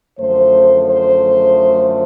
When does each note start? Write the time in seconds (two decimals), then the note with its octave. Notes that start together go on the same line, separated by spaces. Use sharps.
0.18 F#2 D3 F3 A3 C5
0.87 C5